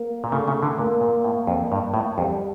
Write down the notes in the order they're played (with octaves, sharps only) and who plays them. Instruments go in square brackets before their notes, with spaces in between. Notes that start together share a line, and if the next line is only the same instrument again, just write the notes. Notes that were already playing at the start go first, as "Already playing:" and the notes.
Already playing: [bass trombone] A#3
[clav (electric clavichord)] A#2
[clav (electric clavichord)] C#3 [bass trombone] A3
[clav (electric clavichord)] C#3
D3
[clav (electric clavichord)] A#2 [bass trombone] A#3
[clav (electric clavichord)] A#2
A2
F2
G2
A2
[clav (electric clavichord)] F2 [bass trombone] G3